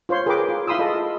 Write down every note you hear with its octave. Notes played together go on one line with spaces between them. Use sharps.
F4 C5 C#5 C6
G#4 A#4 B4 G5 B5 D6
F4
E4 F5 B5 C6 D#6 E6
F4 G#4 A4 D#5